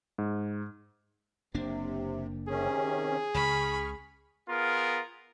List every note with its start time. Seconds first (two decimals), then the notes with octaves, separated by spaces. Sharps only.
0.18 G#2
1.54 F#1 C3 A#3 D4
2.49 C3 D#3 C#4 G#4
3.34 C#2 C#3 B5 C#6 F6
4.48 B3 F4 G#4 A#4